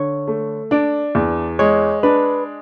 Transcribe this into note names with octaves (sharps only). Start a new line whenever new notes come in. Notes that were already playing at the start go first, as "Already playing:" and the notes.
Already playing: D3 C#5
A3
D4 D5
E2
G#3 C#5
D4 B4